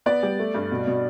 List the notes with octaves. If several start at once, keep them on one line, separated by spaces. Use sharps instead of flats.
B3 D5
G3
A3
G2
B2
B2